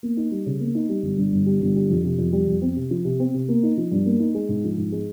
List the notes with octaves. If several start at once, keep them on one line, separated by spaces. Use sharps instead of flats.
A#3
D#4
G3
C#3
A#3
D#4
G3
G1
G2
G1
G3
G1
G3
F2
C3
F2
G3
F2
C4
C3
F3
C3
C4
C3
A#3
D#4
F3
G2
A#3
D#4
G#3
G#2
F3
G#2
G#3